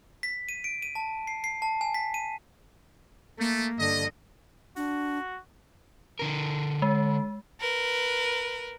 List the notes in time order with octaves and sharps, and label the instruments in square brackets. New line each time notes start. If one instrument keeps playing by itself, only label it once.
[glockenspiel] B6
D#7
D7
D#7
A5
C7
C7
A5
G#5
B6
D#7
[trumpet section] A3 [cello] A#3
[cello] G2 D3 [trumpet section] D#5
[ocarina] D4 [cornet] F#4
[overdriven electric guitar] D3 A#4
[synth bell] G#3
[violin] A#4 B4